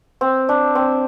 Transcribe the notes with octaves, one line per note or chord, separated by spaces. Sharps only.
C4
D4
C4